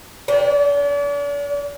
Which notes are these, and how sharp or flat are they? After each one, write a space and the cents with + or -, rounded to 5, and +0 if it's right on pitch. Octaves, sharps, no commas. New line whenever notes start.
D4 -40 G5 +0